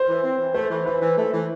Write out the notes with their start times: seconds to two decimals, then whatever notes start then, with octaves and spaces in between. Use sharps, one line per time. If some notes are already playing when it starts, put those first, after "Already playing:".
Already playing: C5
0.08 E3
0.23 C4
0.38 E3
0.54 A3 C5
0.70 E3
0.86 E3 B4
1.01 E3
1.18 A3
1.33 E3